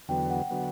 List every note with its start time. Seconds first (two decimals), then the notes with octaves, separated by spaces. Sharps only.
0.08 E2 D3 F#3 B3 G5
0.30 F#5
0.50 D3 F#3 B3 F#5